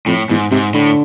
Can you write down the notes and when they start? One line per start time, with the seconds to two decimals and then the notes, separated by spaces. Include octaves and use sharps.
0.06 F2 A2
0.29 E2 G#2
0.51 G#2 C3
0.74 A2 D3